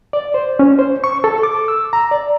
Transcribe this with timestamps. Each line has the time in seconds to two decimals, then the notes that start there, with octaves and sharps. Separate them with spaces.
0.13 D5
0.34 C5
0.59 C#4
0.79 C5
1.04 C#6
1.24 A4
1.43 D6
1.68 E6
1.93 A#5
2.11 D5